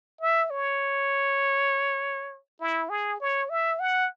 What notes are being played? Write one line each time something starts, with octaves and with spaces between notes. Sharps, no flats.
E5
C#5
E4
G#4
C#5
E5
F#5